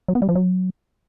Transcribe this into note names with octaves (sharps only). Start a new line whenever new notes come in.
F#3
B3
G3
F3
F#3